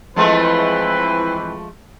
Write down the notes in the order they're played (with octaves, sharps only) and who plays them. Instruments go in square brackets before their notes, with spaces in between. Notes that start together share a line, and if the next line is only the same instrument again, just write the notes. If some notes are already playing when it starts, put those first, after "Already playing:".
[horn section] E3 C4 B4 [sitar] F3 G#3 A3